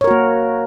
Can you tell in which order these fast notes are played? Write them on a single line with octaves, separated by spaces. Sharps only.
C#5 A#4 F#4 A#3